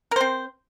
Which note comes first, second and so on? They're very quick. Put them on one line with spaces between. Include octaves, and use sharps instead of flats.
A#4 C5 C4